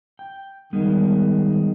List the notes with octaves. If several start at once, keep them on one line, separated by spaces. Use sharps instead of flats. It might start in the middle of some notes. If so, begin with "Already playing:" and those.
G5
D#3 G3 G#3 B3